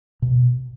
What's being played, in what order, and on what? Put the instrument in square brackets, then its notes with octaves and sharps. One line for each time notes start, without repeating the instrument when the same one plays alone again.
[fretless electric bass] B2